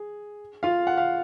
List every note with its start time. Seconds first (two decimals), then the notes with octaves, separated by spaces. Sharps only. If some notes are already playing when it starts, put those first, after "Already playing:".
Already playing: G#4
0.63 F4 F5
0.87 F#5
0.97 F5